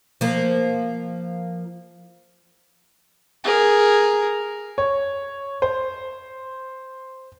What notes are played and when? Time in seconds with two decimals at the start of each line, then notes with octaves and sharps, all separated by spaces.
0.21 F3 A#3
3.44 G#4 A#4
4.78 C#5
5.62 C5